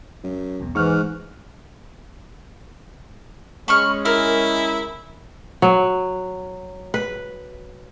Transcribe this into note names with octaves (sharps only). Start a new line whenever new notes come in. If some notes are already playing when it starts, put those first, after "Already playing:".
F#2
B1 E2 B2
G#2 E3 C#6 F6 F#6
G#3 C#4 B5 C#6 F6
E4 A#4
F#3
B4